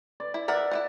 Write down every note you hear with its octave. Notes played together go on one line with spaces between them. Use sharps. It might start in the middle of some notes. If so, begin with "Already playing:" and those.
D5
E4
A#4 D5 E5 F#5
E4 F4 F#5